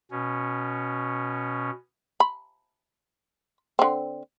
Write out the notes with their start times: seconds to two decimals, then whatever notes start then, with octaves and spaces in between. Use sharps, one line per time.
0.11 B2 C#4
2.20 B5
3.79 D3 C4